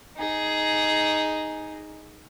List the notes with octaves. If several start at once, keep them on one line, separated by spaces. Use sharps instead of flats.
D#4 G#4